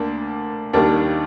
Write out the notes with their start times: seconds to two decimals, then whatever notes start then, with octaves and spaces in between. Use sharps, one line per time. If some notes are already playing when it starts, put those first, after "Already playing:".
Already playing: D2 A#3 D4
0.73 D#2 D#3 G3 A#3 D4